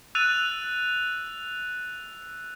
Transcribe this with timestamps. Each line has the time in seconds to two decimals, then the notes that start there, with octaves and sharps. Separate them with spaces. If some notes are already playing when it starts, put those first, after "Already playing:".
0.15 E6 F#6 A6 D#7 F7